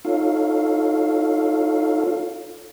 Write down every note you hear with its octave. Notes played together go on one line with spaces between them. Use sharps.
D#4 F4 A4 C#5 F5